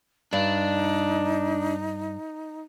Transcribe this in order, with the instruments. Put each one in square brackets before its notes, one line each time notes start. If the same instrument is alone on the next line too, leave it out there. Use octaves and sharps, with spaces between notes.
[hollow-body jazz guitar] G2 [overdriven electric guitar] D4 [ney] D#4